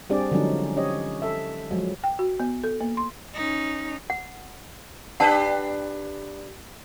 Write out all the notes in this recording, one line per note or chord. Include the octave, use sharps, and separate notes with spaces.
G3 C4 D4 G4 G#4 D5
D3 F3 F#3 G#3 C#4 D#4
C#4 G4 C#5 D#5
A4 E5
F3 F#3 G#3
G5
F#4
B3
A4
A#3
C6
C#4 D#4
F#5
D4 G4 B4 F#5 A5